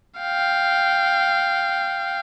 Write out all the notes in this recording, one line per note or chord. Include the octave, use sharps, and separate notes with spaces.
F5 G5